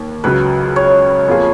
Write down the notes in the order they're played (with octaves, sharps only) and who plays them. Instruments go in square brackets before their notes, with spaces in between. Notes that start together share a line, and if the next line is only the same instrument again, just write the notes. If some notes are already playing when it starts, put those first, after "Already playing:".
Already playing: [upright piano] D#2
[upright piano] C#2 C#3 F#3 [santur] B4
[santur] C#5
[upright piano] F2 F3 A#3 F4 G#4